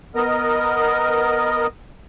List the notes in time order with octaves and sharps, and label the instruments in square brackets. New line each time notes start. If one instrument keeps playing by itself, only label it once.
[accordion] B3 A#4 D#5